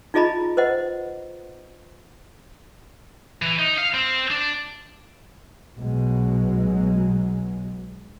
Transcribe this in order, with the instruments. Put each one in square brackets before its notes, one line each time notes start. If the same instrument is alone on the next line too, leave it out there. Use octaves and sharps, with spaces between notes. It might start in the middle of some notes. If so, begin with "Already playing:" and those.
[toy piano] D#4 F4 G#4 D#5 A#5 B5
B4 C5 D#5 F#5
[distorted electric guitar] E3
D#4
F5
C4
D4
[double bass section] B1 B2 F#3 G#3